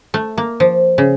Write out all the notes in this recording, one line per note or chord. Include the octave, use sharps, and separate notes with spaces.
A3
A#3
F3
C#3